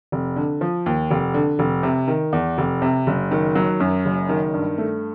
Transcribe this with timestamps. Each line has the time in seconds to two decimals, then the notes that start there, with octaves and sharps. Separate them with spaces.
0.12 F1
0.36 D3
0.61 F3
0.86 D#2
1.11 F1
1.34 D3
1.59 F1
1.83 C3
2.08 D#3
2.33 E2
2.58 F1
2.82 C3
3.07 F#1
3.31 D#3
3.55 F#3
3.80 F#2
4.05 F#1
4.29 D#3
4.54 G2
4.78 A3